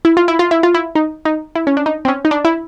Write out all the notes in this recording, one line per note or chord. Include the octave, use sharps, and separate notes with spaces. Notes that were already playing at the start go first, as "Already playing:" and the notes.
E4
F4
E4
F4
E4
F4
E4
D#4
D#4
E4
C#4
D4
D#4
C4
C#4
D#4
D4
E4